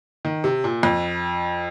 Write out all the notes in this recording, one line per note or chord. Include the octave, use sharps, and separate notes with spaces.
D#3
C3
A#2
F2